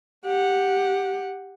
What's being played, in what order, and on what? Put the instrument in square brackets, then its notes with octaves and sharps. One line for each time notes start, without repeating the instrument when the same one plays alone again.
[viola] G4 F#5